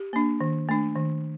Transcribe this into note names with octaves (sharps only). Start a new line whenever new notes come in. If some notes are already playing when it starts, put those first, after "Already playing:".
Already playing: G4
A#3 D4
D#3
A3 D4
D#3